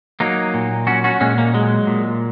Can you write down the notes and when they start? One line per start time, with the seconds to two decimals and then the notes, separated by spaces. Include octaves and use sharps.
0.20 F#3 A#3 D#4
0.54 A#2
0.87 F#3 C#4 F#4
1.04 C#4 F#4
1.21 A#2 G#3 C#4
1.38 A#3
1.53 F#3 G#3
1.87 A#2